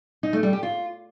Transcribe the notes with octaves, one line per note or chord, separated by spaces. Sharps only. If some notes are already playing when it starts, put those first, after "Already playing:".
D#4
A3
G3
G4
F4